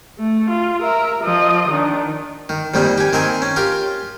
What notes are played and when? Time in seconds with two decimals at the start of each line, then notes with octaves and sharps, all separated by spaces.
0.19 A3
0.50 F4
0.83 A#4 E5
1.24 F3 D#5
1.69 D#3 D4
2.49 D#3
2.74 F2 A#2 D#3 G3 D#4
2.98 G4 G#5
3.13 D#3 C4 D#4 A#4 G#5
3.42 C#4
3.56 F4 G4 A#4